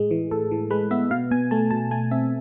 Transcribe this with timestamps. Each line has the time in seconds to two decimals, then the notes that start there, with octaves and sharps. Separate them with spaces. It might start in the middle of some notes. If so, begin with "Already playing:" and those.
Already playing: A2 G#3 G#4
0.11 E3
0.31 A2 A4
0.51 E3
0.70 G#3 B4
0.91 B3 E5
1.11 B2 F5
1.31 B2 G#5
1.51 A3 A5
1.71 B2 A5
1.91 A3 G#5
2.11 C4 E5